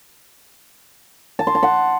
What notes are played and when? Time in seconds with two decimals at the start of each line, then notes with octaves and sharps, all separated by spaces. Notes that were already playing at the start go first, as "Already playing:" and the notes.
1.39 A5
1.47 C6
1.55 A5
1.63 F#5